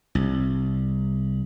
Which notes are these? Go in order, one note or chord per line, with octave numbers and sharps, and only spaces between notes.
C2